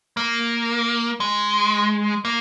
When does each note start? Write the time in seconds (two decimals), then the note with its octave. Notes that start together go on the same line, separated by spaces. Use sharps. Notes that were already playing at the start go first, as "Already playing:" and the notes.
0.17 A#3
1.20 G#3
2.25 A#3